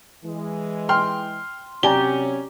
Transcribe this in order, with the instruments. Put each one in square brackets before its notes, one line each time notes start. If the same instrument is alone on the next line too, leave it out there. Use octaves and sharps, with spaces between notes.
[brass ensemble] E3 G#3
[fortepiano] G5 [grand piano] C6 F6
[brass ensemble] C3 F#3 C#4 [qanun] G4 [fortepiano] D5 G#5 A#5 [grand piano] G7